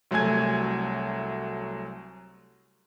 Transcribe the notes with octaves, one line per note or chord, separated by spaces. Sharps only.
C2 F#3 A3 G#5 G#6